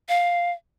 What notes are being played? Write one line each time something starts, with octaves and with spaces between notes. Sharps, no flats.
F5